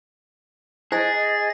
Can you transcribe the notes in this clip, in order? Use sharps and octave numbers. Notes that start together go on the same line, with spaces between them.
E4 G#4 C5 D#5 G#5 A6